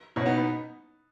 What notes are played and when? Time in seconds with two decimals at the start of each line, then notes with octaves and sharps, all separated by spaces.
0.16 B2 C#4 E4
0.26 B3 D#4
0.37 B3